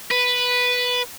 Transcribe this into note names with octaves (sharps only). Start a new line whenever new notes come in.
B4